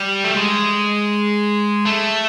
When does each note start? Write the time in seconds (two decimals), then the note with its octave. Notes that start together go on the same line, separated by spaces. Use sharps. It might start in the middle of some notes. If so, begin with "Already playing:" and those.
Already playing: G3
0.24 A3
0.36 G#3
1.85 A3